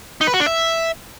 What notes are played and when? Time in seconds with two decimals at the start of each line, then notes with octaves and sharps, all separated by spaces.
0.21 D#4
0.27 B4
0.34 F#4
0.40 D4
0.46 E5